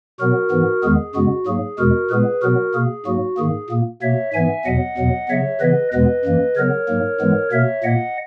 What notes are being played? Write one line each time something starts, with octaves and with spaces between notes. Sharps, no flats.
B2 F#3 B3 F#4 A#4
G#2 E3 B3
E2 D#3 G#3 B3 G#4
F#2 C#3 G#3 B3 F#4
G#2 F#3 A#3 G#4
E2 B2 G#3 F#4 A#4
A#2 G#3 B3 G#4 B4
B2 F#3 B3 F#4 A#4
B2 A#3 G#4
G#2 F#3 A#3 F#4
G#2 D#3 A#3 G#4
A#2 A#3
B2 A#3 C#5 E5
G#2 E3 B3 E5 G#5
E2 B2 F#3 B3 D#5 F#5
E2 B2 F#3 B3
C#3 F#3 B3 C#5 E5
C#3 E3 B3 B4 D#5
E2 B2 G#3 B3 B4 D#5
F#2 E3 A#3
C#3 F#3 B3 A#4 C#5
G#2 F#3 A#3
G#2 E3 G#3 B3
B2 A#3 C#5 E5
A#2 A#3 D#5 F#5